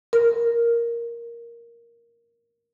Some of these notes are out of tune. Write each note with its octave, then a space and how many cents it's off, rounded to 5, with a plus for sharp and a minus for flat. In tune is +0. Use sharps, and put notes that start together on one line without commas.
A#4 +5